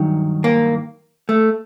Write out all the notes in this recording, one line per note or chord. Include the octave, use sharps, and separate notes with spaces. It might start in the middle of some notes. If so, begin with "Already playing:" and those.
Already playing: G2 D#3 F#3
A#3
A3